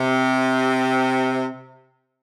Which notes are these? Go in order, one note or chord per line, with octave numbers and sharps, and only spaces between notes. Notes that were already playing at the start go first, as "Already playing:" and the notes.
Already playing: C3